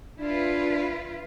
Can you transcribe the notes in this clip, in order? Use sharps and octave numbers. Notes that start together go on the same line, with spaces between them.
D4 E4 F4 B4